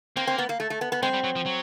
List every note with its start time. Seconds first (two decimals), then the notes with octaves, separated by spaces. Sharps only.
0.16 A#3 C4
0.27 C4
0.38 B3
0.49 A#3
0.60 A3
0.70 A3
0.81 B3
0.92 B3
1.03 G#3 C4
1.14 G3
1.24 F#3
1.36 F3
1.46 F#3